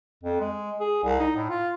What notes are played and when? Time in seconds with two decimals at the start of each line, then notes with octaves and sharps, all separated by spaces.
0.23 F2
0.40 G#3
0.80 G#4
1.04 C2
1.20 D#4
1.36 A2
1.49 F4